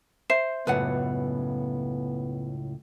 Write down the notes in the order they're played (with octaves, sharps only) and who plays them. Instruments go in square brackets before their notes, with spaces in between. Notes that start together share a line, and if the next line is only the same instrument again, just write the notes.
[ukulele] C5 [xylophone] E5 C7 E7
[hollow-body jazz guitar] C#2 F#2 A2 [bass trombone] B3 [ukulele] B4 F#5